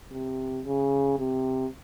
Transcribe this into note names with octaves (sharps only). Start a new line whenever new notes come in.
C3
C#3
C3